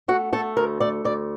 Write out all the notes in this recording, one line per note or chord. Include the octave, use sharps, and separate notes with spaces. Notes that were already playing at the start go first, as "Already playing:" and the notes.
A3 F#4
A3 A4
D2 A#4
A3 D5
D2 D5